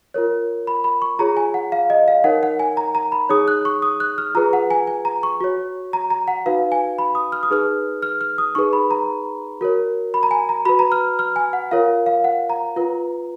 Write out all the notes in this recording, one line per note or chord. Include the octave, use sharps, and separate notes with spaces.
F4 A#4 C#5
B5
B5
C#6
F4 G#4 C#5 A#5
G#5
F#5
F5
D#5
F5
D#4 A#4 C#5 F#5
F#5
G#5
A#5
A#5
B5
D#4 G#4 C#5 D#6
F#6
C#6
D#6
F#6
F6
F4 G#4 B4 A#5
F#5
G#5
G#5
A#5
C#6
F#4 C#5
A#5
A#5
F#5
D#4 F#4 B4 F5
G#5
B5
D#6
F6
D#6
D#4 G#4 B4 F6
F6
F6
D#6
D#4 G#4 B4 C#6
B5
A#5
F#4 A#4 C#5
B5
A#5
G#5
A#5
F#4 B4 B5
A#5
F6
F6
G#5
F#5
F4 A#4 C#5 F5
F5
F#5
A#5
F4 B4